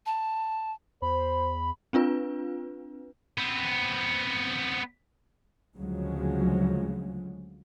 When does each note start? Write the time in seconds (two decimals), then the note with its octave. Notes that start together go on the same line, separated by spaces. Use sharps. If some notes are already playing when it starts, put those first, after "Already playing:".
0.06 A5
1.02 E2 C5 B5
1.93 C4 D4 F4 B4
3.38 B3 C4
5.77 D2 C#3 F3 F#3 G#3